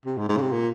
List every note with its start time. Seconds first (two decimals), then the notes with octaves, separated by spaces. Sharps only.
0.06 C3
0.17 G#2
0.29 G#2
0.37 C#3
0.41 C3
0.52 A#2